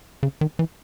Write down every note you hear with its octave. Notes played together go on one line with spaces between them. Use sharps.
C#3
D#3
E3